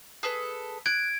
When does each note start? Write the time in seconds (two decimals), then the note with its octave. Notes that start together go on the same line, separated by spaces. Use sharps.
0.23 G#4 A4 B4
0.86 F#6 G#6 D7